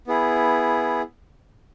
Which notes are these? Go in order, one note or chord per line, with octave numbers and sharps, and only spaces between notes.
B3 E4 G#4